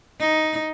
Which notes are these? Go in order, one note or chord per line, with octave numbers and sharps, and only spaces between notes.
D#4